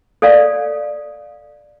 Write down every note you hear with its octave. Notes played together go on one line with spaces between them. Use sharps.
A4 C#5 D5 F5